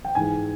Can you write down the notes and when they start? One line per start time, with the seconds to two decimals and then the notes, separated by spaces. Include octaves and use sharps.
0.05 G5
0.15 G#2 E3 G#3 G#5